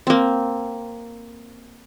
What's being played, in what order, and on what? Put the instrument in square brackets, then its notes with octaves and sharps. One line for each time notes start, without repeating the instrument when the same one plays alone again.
[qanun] A#3 C4